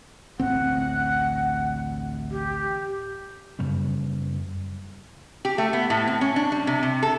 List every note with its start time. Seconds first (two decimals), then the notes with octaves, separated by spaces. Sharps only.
0.40 A1 D2 C4 F#5
2.31 G4
3.59 F#2 C#3 G3 C#4
5.45 G4
5.58 A3
5.73 B3
5.90 A2
6.07 C4
6.21 C#4
6.36 D4
6.52 G3
6.67 C3
6.83 C3
7.03 A4